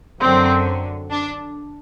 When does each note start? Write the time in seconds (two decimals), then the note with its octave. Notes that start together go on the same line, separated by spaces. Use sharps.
0.20 F#2 D3 F#3 C4
1.11 D4